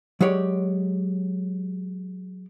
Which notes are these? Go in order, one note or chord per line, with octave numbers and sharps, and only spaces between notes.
F#3 G#3 G4 C#5 D5